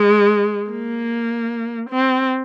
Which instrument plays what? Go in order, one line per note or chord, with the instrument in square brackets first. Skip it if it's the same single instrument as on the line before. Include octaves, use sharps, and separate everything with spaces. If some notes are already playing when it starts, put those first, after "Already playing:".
Already playing: [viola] G#3
A#3
C4